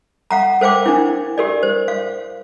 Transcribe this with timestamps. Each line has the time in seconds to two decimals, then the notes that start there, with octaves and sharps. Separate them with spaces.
0.31 F5 F#5 A#5
0.61 A#4 C5 F5 G5 D6
0.86 D4 E4
1.38 G4 A#4 D5
1.63 C5
1.88 F5